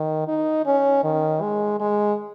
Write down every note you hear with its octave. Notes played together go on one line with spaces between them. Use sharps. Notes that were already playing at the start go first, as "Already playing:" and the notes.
Already playing: D#3
D#4
C#4
D#3
G#3
G#3